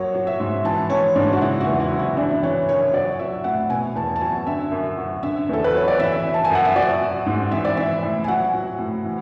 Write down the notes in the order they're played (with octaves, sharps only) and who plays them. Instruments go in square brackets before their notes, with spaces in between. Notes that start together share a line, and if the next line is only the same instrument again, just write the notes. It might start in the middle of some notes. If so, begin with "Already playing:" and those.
Already playing: [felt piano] F#2 F#3 C#5
F#3
E5
G#2
E3 A5
E3 C#5
G#2 D4
F#4
C#3 E4
F#4
E2
E4
F#3
E4
E3 D4
E3 C#5
F#2 C#5
F#3 D5
F#3 E5
A2 F#5
B2 G#5
E2 A5
A5
F#3 G#5
D3 E5
F#2
F#3
D3 E5
E2 A4
B4
F#3 C#5
D5
E3 E5
E3
A5
G#5
F#2 F#5
E5
F#3 D5
F#3
G#2
E3 E5
D5
E3 E5
A2
G#5
F#3 F#5
F#3
A2
E3